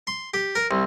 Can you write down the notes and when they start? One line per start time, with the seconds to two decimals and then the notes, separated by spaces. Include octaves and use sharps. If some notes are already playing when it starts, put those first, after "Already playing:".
0.07 C6
0.34 G4
0.55 A#4
0.71 C2